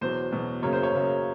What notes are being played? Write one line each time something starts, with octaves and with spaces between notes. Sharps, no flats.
E2 B2 F#3 C5
E2 B2 F#3
F#2 C#3 F#3 A#3 C#5
C5
C#5
F#2 C#3 F#3 A#3